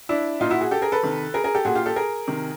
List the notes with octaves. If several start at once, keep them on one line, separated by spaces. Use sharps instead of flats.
D4 E4
A#2 D#4 F4
E4 F#4
F#4 G#4
G4 A4
G#4 A#4
A4 B4
C3 D#3
G#4 A#4
G#4 A#4
G4 A4
A#2 F#4 G#4
F4 G4
G4 A4
G#4 A#4
C3 D#3